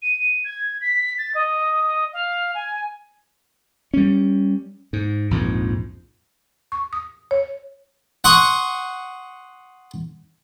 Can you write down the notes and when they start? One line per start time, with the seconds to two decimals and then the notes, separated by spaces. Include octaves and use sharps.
0.02 D#7
0.44 G#6
0.81 B6
1.18 A6
1.34 D#5
2.13 F5
2.55 G#5
3.94 G3 C#4
4.93 G#2
5.31 A#1 F2 G#2
6.72 C#6
6.93 D#6
7.31 C#5
8.24 F#5 C6 C#6 D#6